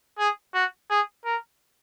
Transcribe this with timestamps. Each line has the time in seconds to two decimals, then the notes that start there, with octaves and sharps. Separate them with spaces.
0.18 G#4
0.54 F#4
0.90 G#4
1.25 A#4